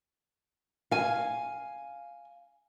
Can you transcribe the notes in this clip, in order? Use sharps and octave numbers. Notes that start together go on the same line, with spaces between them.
F5 G#5